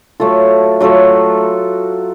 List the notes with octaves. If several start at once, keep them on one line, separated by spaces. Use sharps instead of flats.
F#3 A3 F4 A4
F#3 A3 F4 A4